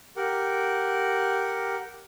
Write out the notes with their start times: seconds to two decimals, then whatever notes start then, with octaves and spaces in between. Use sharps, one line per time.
0.16 G4 A#4 F#5